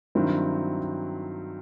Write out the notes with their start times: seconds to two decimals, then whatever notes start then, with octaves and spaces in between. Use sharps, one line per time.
0.15 G2 D#3 F#3 C4 E4